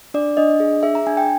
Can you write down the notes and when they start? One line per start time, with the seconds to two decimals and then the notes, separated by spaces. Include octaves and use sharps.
0.14 D4 D5
0.37 D4 D#5
0.60 G#4
0.83 G#4 E5
0.95 A#5
1.07 D4 G#5
1.17 G5